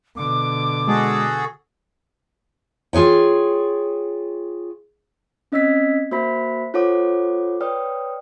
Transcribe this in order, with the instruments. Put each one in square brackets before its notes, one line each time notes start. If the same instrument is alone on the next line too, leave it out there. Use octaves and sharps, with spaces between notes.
[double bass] B2 D3 [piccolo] D6
[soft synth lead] G#3 [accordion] F#4 G#4 A4
[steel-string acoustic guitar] F4 G#4 C#5 G5
[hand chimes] C4 C#4 D#5 E6 G#6 B6
A#3 F#4 C5 E5 B5 B6
F4 A4 C5 C#5 F#5 D6
B4 C#5 D5 G5 D#6 F6